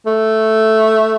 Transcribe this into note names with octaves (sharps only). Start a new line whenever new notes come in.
A3